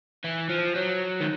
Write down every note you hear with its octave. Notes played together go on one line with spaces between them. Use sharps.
E3
F3
F#3
D#3